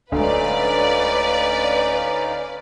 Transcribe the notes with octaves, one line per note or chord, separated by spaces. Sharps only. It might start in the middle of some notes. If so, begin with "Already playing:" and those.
D1 D2 G#3 C#4 D#4 B4 D5 F5